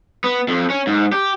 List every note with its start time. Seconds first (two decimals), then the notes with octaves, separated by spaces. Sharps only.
0.24 B3
0.48 F2
0.70 C#4
0.87 G#2
1.13 G4